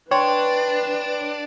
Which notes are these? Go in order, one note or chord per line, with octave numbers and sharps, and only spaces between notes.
D4 B4 C#5 G5 C6